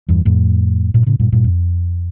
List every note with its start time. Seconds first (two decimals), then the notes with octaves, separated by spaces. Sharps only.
0.09 E2 G2
0.25 F2 A2
0.94 G2 A#2
1.06 A2 C#3
1.20 G2 A#2
1.32 G2 A#2
1.44 F2